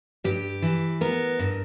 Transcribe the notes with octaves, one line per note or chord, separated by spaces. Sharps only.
G2 G4
E3
B3 A#4
G2